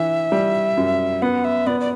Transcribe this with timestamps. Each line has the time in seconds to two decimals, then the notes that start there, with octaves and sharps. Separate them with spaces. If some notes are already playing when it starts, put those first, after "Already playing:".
Already playing: E3 D4 E5
0.32 G3
0.77 F#2
1.22 B3 F#5
1.45 E5
1.67 B3 D5
1.81 D5